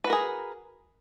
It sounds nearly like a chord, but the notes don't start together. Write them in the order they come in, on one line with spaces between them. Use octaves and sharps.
B4 F#4 A#4 G#4